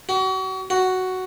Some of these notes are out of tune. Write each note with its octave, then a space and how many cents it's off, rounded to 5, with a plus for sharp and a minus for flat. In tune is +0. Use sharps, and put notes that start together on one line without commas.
F#4 +35
F#4 +5